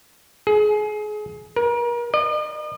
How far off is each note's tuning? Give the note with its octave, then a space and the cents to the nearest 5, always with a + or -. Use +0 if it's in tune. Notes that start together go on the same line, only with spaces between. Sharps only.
G#4 +30
A#4 +35
D#5 -45